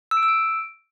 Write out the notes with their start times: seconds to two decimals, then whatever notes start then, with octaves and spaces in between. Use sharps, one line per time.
0.11 E6
0.17 D7
0.23 E6
0.28 D7